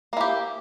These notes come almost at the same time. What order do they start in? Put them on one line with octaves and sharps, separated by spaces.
A#3 E4 G4